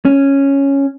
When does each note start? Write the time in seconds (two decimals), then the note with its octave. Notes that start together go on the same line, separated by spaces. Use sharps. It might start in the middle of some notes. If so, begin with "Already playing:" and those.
0.05 C#4